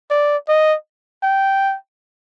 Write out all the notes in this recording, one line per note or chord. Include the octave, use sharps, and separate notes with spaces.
D5
D#5
G5